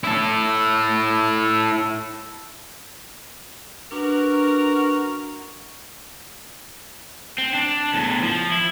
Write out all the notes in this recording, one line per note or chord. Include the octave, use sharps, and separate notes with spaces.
E4 A4
D4 F#4 A#4 B4
C4
D4
E2 A2
F3
E4